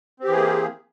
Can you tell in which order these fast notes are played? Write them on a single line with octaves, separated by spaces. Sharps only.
C4 G4 E3 G#4 A#3